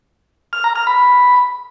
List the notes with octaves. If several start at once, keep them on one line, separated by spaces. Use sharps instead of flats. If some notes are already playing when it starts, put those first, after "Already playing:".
F6
A#5
F6
B5